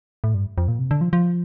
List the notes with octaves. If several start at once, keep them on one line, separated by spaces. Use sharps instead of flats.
A2
G2
F2
A#2
C3
D3
F3
F3